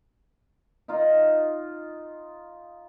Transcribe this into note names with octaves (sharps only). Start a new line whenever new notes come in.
D#4 F4 D#5